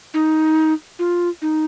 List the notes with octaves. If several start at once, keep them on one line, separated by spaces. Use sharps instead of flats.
D#4
F4
D#4